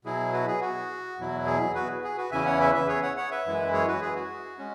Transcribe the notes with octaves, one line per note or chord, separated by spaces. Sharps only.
B2 F#3 E4 G#4
F#4 B4
G#4
F#4
E2 B2 F#3 E4
G#4
F#4 B4
G#4
F#4 B4
E2 C#3 E3 C#4 E4 E5 G#5
C#5 F#5
B4 E5
B4 E5
G#4 C#5
C#5 F#5
C#5 F#5
B4 E5
F#2 E3 G#3 E4
G#4 C#5
F#4 B4
G#4
F#4
G#3 C#4